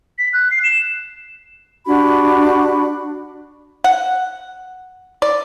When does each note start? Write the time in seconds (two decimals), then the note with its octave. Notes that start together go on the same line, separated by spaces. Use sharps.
0.18 B6
0.33 F#6
0.51 C7
0.64 E7
1.87 D4 F#4 G4 B5
3.84 F#5
5.22 D5